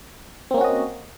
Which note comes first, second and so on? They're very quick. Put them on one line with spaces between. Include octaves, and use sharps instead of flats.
C4 A#3 C#4 F#4 D#5